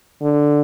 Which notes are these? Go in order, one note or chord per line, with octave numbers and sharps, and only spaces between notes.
D3